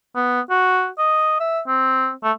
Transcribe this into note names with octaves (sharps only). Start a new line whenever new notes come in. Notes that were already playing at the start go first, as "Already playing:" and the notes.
B3
F#4
D#5
E5
C4
A3